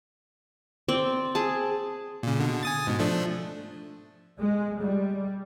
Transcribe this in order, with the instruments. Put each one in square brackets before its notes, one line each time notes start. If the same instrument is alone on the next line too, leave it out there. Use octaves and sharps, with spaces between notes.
[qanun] C4 D5 G5
G#4 A5
[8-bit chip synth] A#2 C#3
B2 D3
G#5 D#6 A6
G#2 B2
F3 A3 D4
[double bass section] G#3
G3